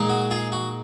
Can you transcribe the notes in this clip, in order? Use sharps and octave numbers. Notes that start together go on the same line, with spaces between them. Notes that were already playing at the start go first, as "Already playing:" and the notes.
Already playing: A#2 G#3 D#4
F#4
F4 G#4
F#4